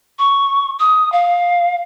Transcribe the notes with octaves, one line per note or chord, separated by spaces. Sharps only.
C#6
D#6
F5